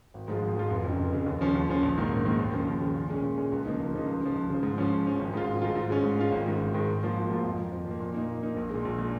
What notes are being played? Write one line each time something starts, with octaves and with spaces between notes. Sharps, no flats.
G#1
G#2 F3 G#3 F4
G#1
G#2 F3 G#3 F4
F1
F2 C#3
F1
F2 C#3
D#2
C#3 F3 C#4
D#2
C#3 F3 C#4
A#1
G#2 D#3 A#3
A#1
G#2 D#3 A#3
D#2
C#3 F3
D#2
C#3 F3
A#2
G#3 C#4
A#2
G#3 C#4
C#2
C#3 F3 A#3 D#4
C#2
C#3 F3 A#3 D#4
C#2
C#3 F3
C#2
C#3 F3
G#2
F3 C#4
G#2
F3 C#4
G#1
G#2 G#3 F4
G#1
G#2 G#3 F4
G#2
G#3 C#4 F4
G#2
G#3 C#4 F4
G#1
G#2 D#3 G#3
G#1
G#2 D#3 G#3
G#1
G#2 F3 A#3 F4
G#1
G#2 F3 A#3 F4
F2
F3 A#3
F2
F3
A#3
A#2
A#3 D#4
A#2
A#3 D#4
A#1
A#2 G#3
A#1
A#2 G#3